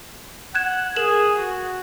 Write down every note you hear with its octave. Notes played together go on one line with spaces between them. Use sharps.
F#5 F#6 G#6 E7
G#4 A#4 E7 F#7
F#4